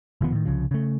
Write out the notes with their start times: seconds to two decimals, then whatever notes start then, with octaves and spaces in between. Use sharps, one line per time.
0.21 F1 D#3 F3 B3
0.32 A2 D#3
0.45 C2 C#3 F3
0.71 C#3 A3